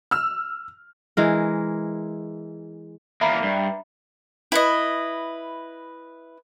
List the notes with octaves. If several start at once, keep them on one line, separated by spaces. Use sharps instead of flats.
E6 F6
E3 G#3 A#4
E2 A#3 E5 A#5 B5
G2
E4 B4 D#5